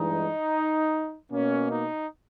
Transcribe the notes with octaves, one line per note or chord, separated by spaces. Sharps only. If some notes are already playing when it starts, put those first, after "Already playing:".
Already playing: G2 E3 G#3 D#4
B2 A#3 C#4
D#4